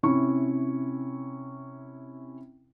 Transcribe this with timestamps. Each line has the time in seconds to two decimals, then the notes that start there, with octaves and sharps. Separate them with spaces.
0.03 C3 C#4 E4 C#6